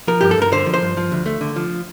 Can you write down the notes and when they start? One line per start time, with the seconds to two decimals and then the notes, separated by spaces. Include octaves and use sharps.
0.07 F3 A#4
0.21 G2 G4
0.31 A4
0.37 G2 A#4
0.52 D3 C5
0.66 F3
0.74 C5
0.82 G2
0.97 F3
1.11 D2
1.26 A3
1.41 D3
1.56 F3